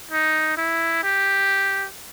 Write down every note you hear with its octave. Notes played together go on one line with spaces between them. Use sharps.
D#4
E4
G4